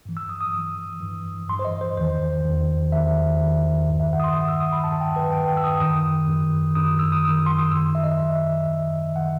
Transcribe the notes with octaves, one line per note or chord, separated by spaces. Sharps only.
G2 E3
E6
D#6
D#6
G2 E3
G2 E3
G2 E3 C6
C5
D#5
C5
E2 D#3 C5
E2 D#3
E2 D#3 E5
E2 D#3
G2 D#3
E5
F#5
D#6
C6
G2 D#3 D#6
E6
D#6
B5
G2 D#3 A5
G5
B4
G2 D#3 G5
G5
E6
D#6
F#2 D#3 D#6
F#2 D#3
F#2 D#3 D#6
E6
D#6
F#2 D#3
C6
D#6
F#2 D#3 E6
E5
D#5
F#2 D#3 E5
F#2 D#3
D#3 F#5